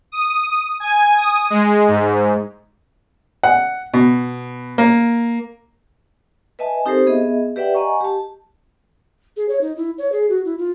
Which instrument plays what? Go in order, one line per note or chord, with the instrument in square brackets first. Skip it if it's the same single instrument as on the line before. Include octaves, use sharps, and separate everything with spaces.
[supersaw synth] D#6
G#5
D#6
G#3
G#2
[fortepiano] F#5
B2
A#3
[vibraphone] B4 D#5 E5 G#5 A5
C4 D#4 G4 A4 A#4 C5
B3 G#4 D#5 E5
G4 B4 D5 E5 F#5 G5
D#5 F#5 G#5 A#5 C#6
G4 A5
[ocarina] G#4
C#5
D#4
E4
C#5
G#4
F#4
E4
F4